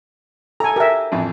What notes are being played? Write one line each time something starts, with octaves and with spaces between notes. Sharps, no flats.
A4 G#5 A#5
G4 A#4 E5
A1 F2